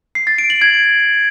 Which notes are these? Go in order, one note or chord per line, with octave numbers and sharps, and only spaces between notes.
C7
A6
D7
F#7
G#6